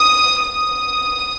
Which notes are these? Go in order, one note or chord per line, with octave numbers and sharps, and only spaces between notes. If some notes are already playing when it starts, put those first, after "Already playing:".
Already playing: D#6
D#6